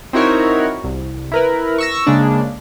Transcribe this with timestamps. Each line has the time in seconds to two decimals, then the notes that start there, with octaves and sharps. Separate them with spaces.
0.13 C4 D#4 E4 F#4 A#4 C#5
0.84 C2
1.32 E4 A#4 B4
1.78 C#6 E6 A#6
2.07 C#3 G#3 A#3 D4